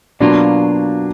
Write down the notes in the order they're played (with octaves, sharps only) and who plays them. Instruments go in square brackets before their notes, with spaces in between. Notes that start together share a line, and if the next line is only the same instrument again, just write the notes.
[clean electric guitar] B2 F#3 A#3 F4 [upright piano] D4